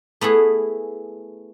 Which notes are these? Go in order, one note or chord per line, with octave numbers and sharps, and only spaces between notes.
A3 B3 E4 G#4